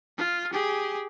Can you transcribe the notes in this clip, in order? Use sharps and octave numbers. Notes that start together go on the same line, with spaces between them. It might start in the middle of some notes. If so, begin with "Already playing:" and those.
F4
G4 G#4